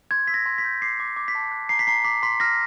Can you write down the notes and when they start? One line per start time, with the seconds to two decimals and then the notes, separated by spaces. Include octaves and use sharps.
0.11 C6 G#6
0.28 E6 B6
0.34 A#6
0.46 C6
0.58 B6
0.64 G6
0.82 D6 C7
1.00 D6
1.16 D6
1.28 B6
1.35 A5
1.52 F#6
1.69 A#5 C7
1.79 B6
1.87 A#5 C7
2.04 D6 B6
2.23 C6 B6
2.40 F6 A#6